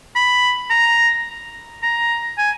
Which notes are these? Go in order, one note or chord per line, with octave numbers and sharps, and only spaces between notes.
B5
A#5
A#5
G#5